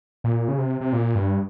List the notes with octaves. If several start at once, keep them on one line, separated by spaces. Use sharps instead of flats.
A#2
C#3
C3
C3
A#2
G2